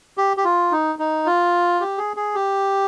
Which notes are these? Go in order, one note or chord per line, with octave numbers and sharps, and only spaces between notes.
G4
G4
F4
D#4
D#4
F4
G4
G#4
G#4
G4